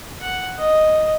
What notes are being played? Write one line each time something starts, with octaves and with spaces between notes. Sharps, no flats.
F#5
D#5